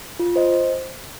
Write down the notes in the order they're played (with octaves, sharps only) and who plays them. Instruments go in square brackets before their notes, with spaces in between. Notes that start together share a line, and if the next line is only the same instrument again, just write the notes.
[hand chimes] F4
C5 D#5